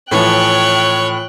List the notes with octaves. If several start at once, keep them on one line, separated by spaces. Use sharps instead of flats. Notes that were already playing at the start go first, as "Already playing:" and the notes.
A2 E3 F3 C#5 G5 F#6